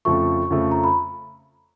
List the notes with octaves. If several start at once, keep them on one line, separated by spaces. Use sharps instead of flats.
F2 C#3 F3 A3 C#6
F2 C#3 F3 A3
A#5
B5